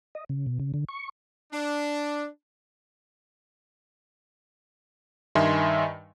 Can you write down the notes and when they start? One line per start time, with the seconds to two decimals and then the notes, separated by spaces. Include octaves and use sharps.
0.15 D#5
0.29 C#3
0.46 B2
0.60 C#3
0.74 D3
0.89 C#6
1.53 D4
5.35 G2 D#3 D#5 E5 G#5 C6